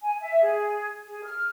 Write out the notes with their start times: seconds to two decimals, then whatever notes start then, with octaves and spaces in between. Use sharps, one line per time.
0.01 G#5
0.21 E5
0.40 G#4
1.05 G#4
1.25 F6